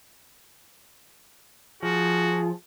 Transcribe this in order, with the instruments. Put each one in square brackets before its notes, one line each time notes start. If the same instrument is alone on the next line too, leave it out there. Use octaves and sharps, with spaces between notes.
[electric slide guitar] F3 [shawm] F#4 [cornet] G#4